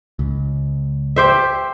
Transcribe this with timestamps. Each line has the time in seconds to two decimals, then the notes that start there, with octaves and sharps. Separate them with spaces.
0.19 C#2
1.16 G4 C5 E5